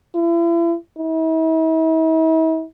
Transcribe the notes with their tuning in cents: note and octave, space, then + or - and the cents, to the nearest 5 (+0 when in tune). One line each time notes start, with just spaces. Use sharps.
E4 +40
E4 -45